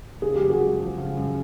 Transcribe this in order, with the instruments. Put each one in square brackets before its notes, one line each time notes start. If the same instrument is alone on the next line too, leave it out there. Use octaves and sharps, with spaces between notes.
[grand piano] C#3 [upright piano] G#4
[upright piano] G4
[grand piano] F#2
[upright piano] F#4 G#4
[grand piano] G#3
F3
C#3
F#2